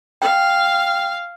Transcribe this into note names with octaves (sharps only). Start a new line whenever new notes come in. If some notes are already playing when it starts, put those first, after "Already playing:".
F5 G5